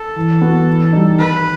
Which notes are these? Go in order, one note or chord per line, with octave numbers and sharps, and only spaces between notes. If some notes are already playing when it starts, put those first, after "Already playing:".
Already playing: A4
E3
B3 F#4
E3
G3 D#4
D#3 B4